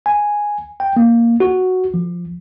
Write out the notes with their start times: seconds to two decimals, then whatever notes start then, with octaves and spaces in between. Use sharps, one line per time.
0.06 G#5
0.80 G5
0.97 A#3
1.40 F#4
1.94 F3